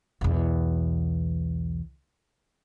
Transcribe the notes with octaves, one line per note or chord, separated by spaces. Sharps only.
B1 E2